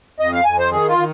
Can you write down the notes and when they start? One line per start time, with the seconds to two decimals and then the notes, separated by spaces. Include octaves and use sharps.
0.20 F2 D#5
0.32 F5
0.45 F2 G#5
0.59 C5
0.71 D#3 G#4
0.88 F4
0.98 D#3